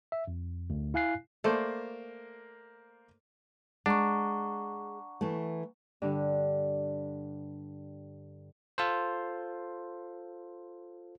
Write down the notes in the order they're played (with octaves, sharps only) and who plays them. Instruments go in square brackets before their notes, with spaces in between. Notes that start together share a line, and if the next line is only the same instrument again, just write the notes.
[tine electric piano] E5
F2
D2
E4 F5 G#5 F#6 C7
[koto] A3 [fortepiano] A#3 C5 D5
[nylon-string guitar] G#3 [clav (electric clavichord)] D4 [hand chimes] F#5 A#5 C#6
[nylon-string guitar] E3 A3
[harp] G2 D3
[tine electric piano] F4 A4 C5